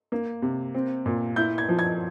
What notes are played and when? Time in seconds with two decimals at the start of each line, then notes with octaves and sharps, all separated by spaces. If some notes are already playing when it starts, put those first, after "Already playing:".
0.12 A#3
0.42 C3
0.74 C4
1.06 A#2
1.36 E4 G6
1.58 G#6
1.69 F3
1.79 G#6